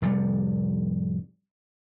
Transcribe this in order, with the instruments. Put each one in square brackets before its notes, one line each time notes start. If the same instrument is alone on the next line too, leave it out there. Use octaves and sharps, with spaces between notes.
[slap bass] F1 A2 C3 G3